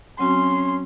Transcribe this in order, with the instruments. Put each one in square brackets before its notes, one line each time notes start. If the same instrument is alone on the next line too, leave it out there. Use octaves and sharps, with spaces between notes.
[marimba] F#3 C4 F#4 [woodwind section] C#4 [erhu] C6